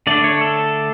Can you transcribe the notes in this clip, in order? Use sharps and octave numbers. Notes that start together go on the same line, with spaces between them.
D3 A3 D4 D5
C#5
A4